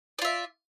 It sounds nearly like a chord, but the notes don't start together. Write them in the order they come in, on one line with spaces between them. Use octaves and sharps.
D5 F4 E5